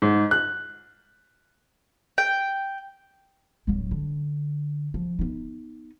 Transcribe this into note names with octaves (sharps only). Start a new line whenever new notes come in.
G#2
F#6
G5
D1 F#3
D3
F3
B3 D#4